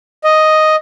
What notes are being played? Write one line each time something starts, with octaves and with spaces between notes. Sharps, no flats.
D#5